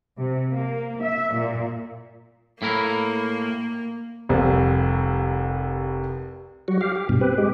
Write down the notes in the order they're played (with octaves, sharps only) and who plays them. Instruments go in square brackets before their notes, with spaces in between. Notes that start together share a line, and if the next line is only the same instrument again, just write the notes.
[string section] C3
A#3
E5
A#2
[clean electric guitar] A2 E4 A#4 [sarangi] A#3
[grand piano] F1 C2 F3
[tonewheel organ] F#3 G3 F#4
G4 F5
G4
G2 B2
C4 G4 B4
G#3 G4